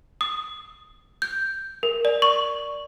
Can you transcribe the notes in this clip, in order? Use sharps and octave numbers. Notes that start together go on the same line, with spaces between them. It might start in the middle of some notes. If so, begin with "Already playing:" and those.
D#6
G6
A#4
D5
C#6